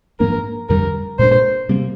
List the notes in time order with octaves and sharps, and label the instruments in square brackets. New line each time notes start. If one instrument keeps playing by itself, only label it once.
[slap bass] G#2 F3 A#3 D4 [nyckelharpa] A#4
[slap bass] F2 D3 G3 [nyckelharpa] A#4
[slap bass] A#2 G#3 D4 [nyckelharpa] C5
[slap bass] C3 G3 A#3